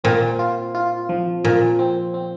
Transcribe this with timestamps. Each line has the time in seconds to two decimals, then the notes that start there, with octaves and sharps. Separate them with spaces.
0.04 A#2 C4
0.39 F4
0.75 F4
1.09 F3
1.44 A#2 F3
1.79 C4
2.14 C4